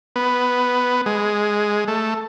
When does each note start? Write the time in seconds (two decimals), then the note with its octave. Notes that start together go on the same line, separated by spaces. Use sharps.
0.16 B3
1.06 G#3
1.88 A3